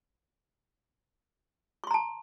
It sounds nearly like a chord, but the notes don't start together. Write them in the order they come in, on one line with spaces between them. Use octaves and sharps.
C#6 C6 A#5 A5